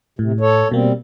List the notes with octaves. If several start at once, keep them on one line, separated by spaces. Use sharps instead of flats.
A2 C3
A4 C#5
B2 G3 A#3 C4